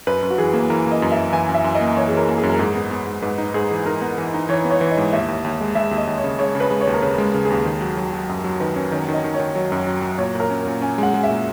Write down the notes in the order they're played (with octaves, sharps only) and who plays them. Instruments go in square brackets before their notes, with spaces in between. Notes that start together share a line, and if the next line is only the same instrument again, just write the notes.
[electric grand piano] F#2 [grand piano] B4
[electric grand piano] F#2
[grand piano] F#4
[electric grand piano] E3 [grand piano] G#4
[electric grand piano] A#3
[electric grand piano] E3 [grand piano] A#4
[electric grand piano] A#3
[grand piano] D#5
[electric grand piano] F#2
[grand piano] E5
[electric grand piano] F#2
[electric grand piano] E3 [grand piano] G#5
[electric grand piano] F#2
[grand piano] E5
[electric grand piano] F#2
[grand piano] D#5
[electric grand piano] A#3
[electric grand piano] E3 [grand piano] C#5
[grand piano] G#4
[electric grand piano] E3 [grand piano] A#4
[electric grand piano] A#3
[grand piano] G#4
[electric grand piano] F#2
[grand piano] A#4
[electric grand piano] G#2 [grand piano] G#4
[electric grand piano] B3
B3
G#2
[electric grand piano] G#2 [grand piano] B4
[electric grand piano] D#4
[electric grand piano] G#2 [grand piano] G#4
[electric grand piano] E3
[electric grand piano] D#4 [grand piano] A#4
[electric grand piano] B3
[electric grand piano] E3 [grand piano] B4
[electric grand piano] D#4
[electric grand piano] E3 [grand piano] C#5
[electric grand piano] B3
[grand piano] C#5
[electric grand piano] E3
[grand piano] D#5
[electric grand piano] G#2
[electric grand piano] D#2 [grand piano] E5
[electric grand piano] D#2
D#2
G#3
[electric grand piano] G#3 [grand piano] E5
[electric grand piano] D#2
[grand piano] D#5
[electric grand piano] D#2
[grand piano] C#5
[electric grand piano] C#3
[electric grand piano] G#3 [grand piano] C#5
[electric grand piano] C#3
[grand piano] B4
[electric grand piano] G#3
[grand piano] C#5
[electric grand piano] D#2
[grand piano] A#4
[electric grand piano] C#3 [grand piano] B4
[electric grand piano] G#3
C#3
[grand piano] G#4
[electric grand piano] D#2
D#3
F#3
F#3
F#3
F#2
F#3
[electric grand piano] D#3 [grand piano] B4
[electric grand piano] C#4
[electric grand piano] D#3 [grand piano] C#5
[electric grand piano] D#3
[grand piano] D#5
[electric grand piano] D#3
[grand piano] C#5
[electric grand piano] D#3
F#3
F#2
F#3
F#3
[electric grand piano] A#2 [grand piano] C#5
[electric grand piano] A#2 [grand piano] A#4
[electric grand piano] C#4
A#2
[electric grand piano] C#4 [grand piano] G#5
[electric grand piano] G#3 [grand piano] F#5
[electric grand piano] G#3
[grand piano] E5
[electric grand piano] A#2